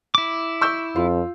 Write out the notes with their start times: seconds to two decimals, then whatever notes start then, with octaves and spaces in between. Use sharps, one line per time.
0.15 E4 D6
0.61 C#6 E6 G6
0.96 F2 F4